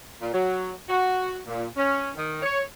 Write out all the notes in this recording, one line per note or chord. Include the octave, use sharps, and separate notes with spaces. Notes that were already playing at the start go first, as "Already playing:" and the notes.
A#2
F#3
F#4
A#2
C#4
D#3
C#5